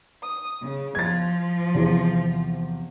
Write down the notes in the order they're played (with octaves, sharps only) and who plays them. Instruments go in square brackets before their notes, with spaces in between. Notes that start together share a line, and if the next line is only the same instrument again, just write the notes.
[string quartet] D#6
C#3
[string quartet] F3 [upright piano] G#6 A6
[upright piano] E2 C3